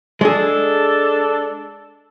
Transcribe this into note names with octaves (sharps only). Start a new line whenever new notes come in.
G#3 D4 G#4 A4